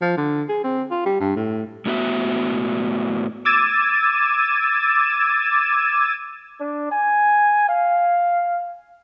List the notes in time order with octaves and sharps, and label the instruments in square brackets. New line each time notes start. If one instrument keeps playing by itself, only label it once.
[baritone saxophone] F3
D3
G#4
C4
F4
G3
G2
A2
[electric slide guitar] A2 B3 F#4 E5
[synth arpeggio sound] D6 E6 G#6 A6 D#7 E7
[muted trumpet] D4
G#5
F5